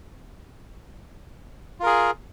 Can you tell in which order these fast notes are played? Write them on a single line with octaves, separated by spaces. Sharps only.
F4 A#4 G#4